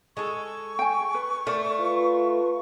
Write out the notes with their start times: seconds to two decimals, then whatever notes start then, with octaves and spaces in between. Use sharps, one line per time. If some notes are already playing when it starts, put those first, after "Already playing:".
0.17 G#3 A4 C#6
0.79 G5 G#5
1.14 B4
1.47 A3 A#4 C5 D5
1.78 F4 B4